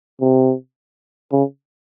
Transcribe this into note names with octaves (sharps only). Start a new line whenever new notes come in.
C3
C#3